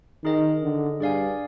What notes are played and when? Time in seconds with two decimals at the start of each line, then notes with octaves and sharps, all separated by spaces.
0.24 D#3 D#4 G#4 D#5
0.63 D3
1.00 G2 G#4 D5 F5 G#5